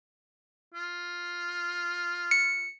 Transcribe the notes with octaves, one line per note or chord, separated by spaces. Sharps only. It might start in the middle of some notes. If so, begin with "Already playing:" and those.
F4
C#7